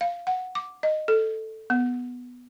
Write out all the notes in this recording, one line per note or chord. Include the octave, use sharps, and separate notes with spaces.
F5
F#5
D6
D#5
A4
B3